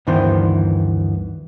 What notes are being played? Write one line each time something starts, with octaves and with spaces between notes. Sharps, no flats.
D2 G2 D#3 E3 B3 C5